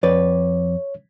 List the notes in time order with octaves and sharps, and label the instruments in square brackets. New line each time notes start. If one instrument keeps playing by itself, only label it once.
[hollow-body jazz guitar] F2 B4 D5 [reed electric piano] C#5